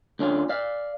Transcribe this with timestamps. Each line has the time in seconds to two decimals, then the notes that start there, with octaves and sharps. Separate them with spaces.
0.19 D2 D3 C#4 F4
0.49 D5 F5